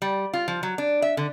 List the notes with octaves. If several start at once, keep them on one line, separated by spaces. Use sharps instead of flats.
G3
F4
F3
F#3
D4
E5
D3